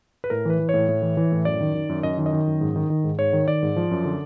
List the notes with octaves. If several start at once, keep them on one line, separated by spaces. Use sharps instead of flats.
B4
A2 A#4
E3 B4
E3
C#5
A2
A2
E3
E3
A2
F#2 D5
D#3
D#3
F#2
F#2 D#5
D#3
D#5
D#3
F#2
G#2
D#3
D#3
G#2
G#2 C#5
D#3
D#3 D5
G#2
F3
F#2
D3